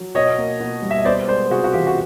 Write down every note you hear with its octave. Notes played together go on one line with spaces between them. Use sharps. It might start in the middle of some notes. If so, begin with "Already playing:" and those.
Already playing: F#3
B2 C#5 D#5
A#3
B2
G3
E5
D#5
B3 C5 D5
G#3 C5 D5
C3 F#4 G#4
F#4
E3 F4 G4
F#4